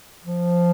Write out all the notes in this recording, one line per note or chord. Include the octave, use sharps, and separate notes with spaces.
F3